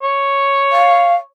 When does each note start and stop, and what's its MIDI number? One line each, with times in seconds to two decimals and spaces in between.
0.03 1.24 73
0.71 1.15 77